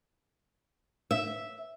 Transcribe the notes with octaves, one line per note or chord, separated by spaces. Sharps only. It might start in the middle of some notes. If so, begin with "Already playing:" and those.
E5